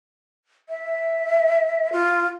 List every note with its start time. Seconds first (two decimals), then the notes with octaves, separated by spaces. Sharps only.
0.69 E5
1.92 F4